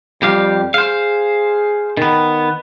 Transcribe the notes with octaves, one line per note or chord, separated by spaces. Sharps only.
F2 G3 G4 F5
G#4 C5 F5
D#3 B3